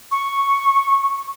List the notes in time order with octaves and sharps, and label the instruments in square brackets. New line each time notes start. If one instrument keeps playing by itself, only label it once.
[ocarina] C#6